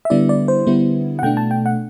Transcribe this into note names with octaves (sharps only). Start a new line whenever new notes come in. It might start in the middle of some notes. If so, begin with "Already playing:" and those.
E5
D3 G3 B3 E4 D5
D5
C5
D3 G3 B3 E4
F#5
B2 A3 D4 G5
A5
G5
F#5